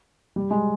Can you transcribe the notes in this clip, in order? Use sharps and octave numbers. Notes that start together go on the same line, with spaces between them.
G3
G#3